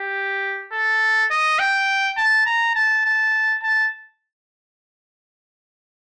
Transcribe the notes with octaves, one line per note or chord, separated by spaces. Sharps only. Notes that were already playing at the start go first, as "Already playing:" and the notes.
Already playing: G4
A4
D#5
G5
A5
A#5
A5
A5
A5